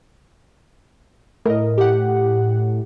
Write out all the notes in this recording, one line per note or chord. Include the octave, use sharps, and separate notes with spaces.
A2 A#4 D#5
G4 F#5